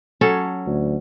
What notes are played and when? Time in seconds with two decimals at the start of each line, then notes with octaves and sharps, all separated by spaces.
0.21 F#3 C#4 A4
0.66 D2